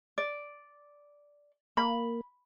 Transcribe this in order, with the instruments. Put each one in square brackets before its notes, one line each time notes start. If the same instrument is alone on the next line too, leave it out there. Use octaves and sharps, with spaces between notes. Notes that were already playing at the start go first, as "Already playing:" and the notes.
[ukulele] D5
[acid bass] A#3 [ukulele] B5